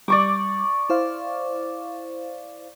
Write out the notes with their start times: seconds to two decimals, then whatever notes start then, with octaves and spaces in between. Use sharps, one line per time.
0.08 G3 D5 C#6 D6
0.90 E4 C5 F5